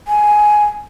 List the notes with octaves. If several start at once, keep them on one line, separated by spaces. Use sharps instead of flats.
G#5